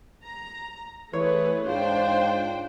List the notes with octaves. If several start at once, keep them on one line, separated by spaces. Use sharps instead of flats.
A#5
E3 A3 G#4 B4 C#5
G#2 D4 F4 C5 G5